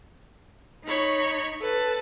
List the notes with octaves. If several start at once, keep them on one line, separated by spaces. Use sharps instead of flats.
D#4 C#5 B5 C#6
A4 B4 A5